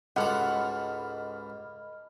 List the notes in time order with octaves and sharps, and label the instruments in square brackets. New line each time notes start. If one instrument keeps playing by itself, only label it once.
[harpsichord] C#2 G#2 F#4 [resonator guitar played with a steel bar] A4 F#5 [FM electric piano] D#5 B5 F6